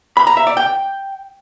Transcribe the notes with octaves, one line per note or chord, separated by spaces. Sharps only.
B5
A#5
E5
D5
G5